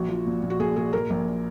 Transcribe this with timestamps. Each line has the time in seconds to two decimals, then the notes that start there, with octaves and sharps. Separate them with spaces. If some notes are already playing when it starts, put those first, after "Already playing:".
Already playing: A#1 F#4
0.09 F3
0.26 A#2
0.43 A#2
0.50 F#4
0.59 A#2 G#4
0.76 A#2 G#4
0.93 A#2 A#4
1.10 A#1